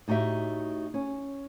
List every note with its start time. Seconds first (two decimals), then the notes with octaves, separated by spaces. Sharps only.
0.08 A2 D#4 F#4 G4 E5
0.94 C#4